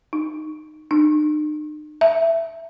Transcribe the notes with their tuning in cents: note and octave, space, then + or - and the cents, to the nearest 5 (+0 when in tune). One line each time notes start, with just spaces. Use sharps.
D#4 -15
D#4 -45
E5 +10